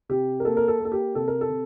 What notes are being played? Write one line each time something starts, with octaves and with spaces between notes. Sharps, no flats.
C3 G4
A#4
A#3 A4
A#4
A4
A#3
A4
G4
C3 A4
A#4
A4
C3